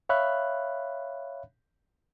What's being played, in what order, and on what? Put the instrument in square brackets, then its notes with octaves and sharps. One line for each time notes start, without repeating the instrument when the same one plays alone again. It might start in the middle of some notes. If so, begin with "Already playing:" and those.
[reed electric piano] C#5 E5 F5 B5 F#6